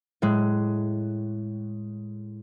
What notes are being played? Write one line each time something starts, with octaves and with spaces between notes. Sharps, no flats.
A2 G#3 F#6